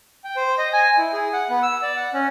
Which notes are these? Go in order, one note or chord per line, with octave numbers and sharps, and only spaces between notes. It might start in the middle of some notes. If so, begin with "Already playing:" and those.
G5
C5
D#5
G#5
E4
G#4
F#5
B3
E6
D5
F#5
C#4